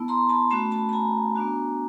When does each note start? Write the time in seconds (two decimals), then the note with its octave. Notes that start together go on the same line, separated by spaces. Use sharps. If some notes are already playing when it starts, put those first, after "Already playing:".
Already playing: B3 E4 A5 B5
0.08 A#5 C6
0.29 A5 B5
0.50 A3 C#4 F#4 A5 B5
0.71 A5 B5
0.89 B5
0.93 G#5 A#5
1.36 B3 D4 F#4